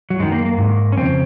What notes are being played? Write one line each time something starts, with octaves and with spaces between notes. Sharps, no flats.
F#3
F#2 D#3 G#3
A#3
A#3
G#2 D#3
C#4
F2 C#3 C4